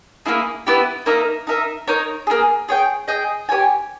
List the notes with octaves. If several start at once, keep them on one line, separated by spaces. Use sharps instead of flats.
A#3 C#4 E4 G#4
B3 E4 G4
A#3 D#4 A#4 E5
D#4 A#4 E5
D#4 A#4 C#5
A#3 E4 G#4
G#4 C#5 G5
G#4 D#5 G5
G4 A#4 C#5 G#5